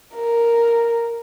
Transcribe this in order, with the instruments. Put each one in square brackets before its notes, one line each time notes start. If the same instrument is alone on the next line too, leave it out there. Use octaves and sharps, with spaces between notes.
[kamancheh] A#4